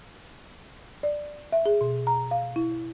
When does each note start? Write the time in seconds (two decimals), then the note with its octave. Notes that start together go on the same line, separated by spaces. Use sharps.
1.03 D5
1.52 E5
1.66 G#4
1.81 B2
2.07 A#5
2.31 F5
2.56 E4